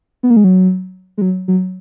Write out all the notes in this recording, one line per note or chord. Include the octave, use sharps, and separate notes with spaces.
B3
A#3
G#3
F#3
G#3
F#3
F#3